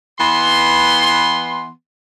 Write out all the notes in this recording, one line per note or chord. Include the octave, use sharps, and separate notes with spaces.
E3 B3 C6